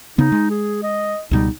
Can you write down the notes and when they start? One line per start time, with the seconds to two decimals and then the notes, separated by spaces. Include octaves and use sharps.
0.18 C#3 B3 D#4
0.32 G#3
0.50 G#4
0.83 D#5
1.31 C#2 B2 G3 D#4